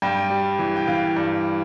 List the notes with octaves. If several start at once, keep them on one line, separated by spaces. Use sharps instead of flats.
G2 G5
G3
E3
G5
E3 F5
G2